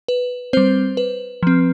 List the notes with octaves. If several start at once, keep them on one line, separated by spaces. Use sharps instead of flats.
B4
G3 C4 C5
B4
F3 C4